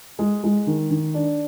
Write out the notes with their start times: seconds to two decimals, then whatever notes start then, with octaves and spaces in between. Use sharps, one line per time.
0.19 G#3
0.44 G#3
0.67 D#3
0.90 D#3
1.14 D4